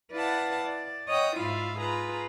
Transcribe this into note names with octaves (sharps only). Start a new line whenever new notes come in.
E4 B4 D5 F5 F#5 A5
D5
C#5 D#5 F#5 G5 D#6
G#2 E4 F4 E5 F5 B5
F4 G#4 B4 A#5 B5